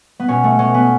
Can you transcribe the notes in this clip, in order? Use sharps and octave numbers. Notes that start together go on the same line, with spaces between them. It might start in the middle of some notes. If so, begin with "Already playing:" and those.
B3
B2 C#4
A3
B2 C#4
B3